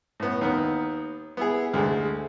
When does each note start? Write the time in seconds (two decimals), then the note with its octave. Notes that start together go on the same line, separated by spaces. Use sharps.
0.20 A2 B3
0.41 D#2 D#3 B3
1.37 B3 E4 G#4
1.73 D2 G#3 A3 G#4